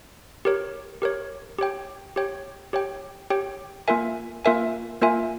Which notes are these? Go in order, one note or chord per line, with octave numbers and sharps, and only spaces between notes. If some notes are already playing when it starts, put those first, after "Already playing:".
G4 A#4 C#5
G4 A#4 C#5
G4 C#5 G5
G4 C#5 G5
G4 C#5 G5
G4 C#5 G5
A#3 F4 A#4 E5 G#5
A#3 F4 A#4 E5 G#5
A#3 F4 A#4 E5 G#5